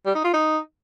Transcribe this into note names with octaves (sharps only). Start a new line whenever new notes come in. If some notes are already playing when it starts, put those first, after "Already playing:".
G3
D#4
F4
D#4